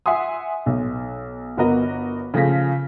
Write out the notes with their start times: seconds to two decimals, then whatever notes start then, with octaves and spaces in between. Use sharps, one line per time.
0.06 E5 F#5 G#5 C6 D#6
0.66 B1
1.57 G1 B3 F#4 A#4 D#5
2.34 C#3 F3 A3 G#4 A#6 B6